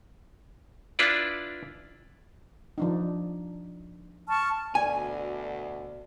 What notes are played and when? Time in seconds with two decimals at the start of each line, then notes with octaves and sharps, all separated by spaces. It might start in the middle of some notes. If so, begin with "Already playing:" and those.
0.99 D4 E4 F4 B4 D5
2.78 F3 D4 D#4
4.29 A5 C#6 F6
4.75 D2 B2 D5 G#5